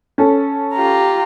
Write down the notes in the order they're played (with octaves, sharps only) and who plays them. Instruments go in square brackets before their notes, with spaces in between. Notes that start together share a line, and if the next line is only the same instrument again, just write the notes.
[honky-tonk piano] C#4 A4
[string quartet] F4 G4 A#5